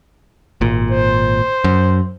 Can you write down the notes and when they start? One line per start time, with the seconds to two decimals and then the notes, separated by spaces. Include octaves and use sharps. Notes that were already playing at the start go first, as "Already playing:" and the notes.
0.61 G#1 A#2
0.91 C5
1.64 F#2